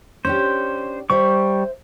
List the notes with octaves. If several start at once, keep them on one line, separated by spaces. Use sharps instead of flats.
C#4 D4 G4 C5
G3 C5 E5 C#6